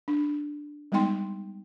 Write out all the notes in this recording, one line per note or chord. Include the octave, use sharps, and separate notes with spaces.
D4
G3 G#3 B3 D#4 G5 C6